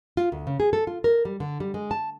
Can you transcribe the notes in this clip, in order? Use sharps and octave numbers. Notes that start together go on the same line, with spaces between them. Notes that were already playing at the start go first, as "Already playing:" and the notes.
F4
D2
C#3
G#4
A4
F4
A#4
G3
D3
G3
G#3
A5